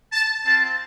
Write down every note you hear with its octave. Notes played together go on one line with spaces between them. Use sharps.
A5
C4 F4 A5